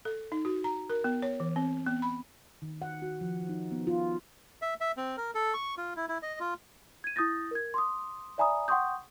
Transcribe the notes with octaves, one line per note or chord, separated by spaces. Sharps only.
A4
D#4
F#4
A#5
A#4
B3
C#5
E3
C4
B3
B5
D#3
F#5
F#4
F3
D#4
B3
F4
E5
E5
C4
A#4
A4
C#6
F4
E4
E4
D#5
F4
G#6 D#7
E4 D#6 G6 A6 A#6
A#4 G#6
C6 D6 D#6
D5 E5 G#5 A#5 B5 D#6
F#5 G5 C6 C#6 D#6 G6